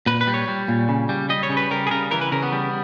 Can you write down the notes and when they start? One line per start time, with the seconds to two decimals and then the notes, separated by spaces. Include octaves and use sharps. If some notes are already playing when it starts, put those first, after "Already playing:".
0.06 A#2 B4
0.21 B4
0.27 G3
0.34 C#5
0.48 G3
0.68 A#2
0.89 C#3
1.09 G3
1.29 G3 D#5
1.43 C#5
1.50 C#3
1.57 B4
1.71 G3 A#4
1.87 G#4
1.91 C#3 A#4
2.11 E3 A#4
2.21 B4
2.32 C#3 A#4
2.42 B3
2.52 G3